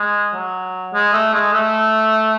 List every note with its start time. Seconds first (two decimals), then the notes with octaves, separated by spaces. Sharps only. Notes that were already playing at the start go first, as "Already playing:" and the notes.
Already playing: G#3
0.34 F#3
0.93 G#3
1.13 A3
1.34 G#3
1.53 A3